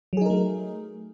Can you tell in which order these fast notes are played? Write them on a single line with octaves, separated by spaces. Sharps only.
F#3 G#4 D#4 A#4 A3